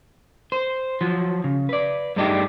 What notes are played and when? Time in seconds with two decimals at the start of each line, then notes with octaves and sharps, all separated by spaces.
0.52 C5
1.01 F3 F#3
1.44 C#3
1.69 B4 D5
2.16 G2 G#3 A3 D4 D#4 G4